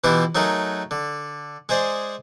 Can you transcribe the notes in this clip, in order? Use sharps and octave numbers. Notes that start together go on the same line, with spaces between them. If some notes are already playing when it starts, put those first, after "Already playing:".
B2 E3 E4 F4 G4
F#3 A3 D#4 G#4 A#4
D3
G#3 G#4 C5 D5